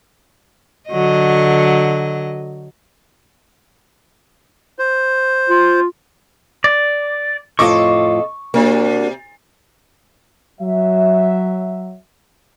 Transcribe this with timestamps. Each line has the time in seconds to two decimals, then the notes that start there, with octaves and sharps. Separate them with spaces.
0.89 D3 F#3 D#5
4.79 C5
5.49 F4
6.64 D5
7.59 F2 A2 F4 A4 D#5 C#6 D6
8.54 C3 A#3 D4 F#4
10.60 F#3 E5